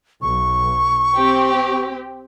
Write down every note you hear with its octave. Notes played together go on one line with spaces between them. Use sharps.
B1 C#6
C4 G4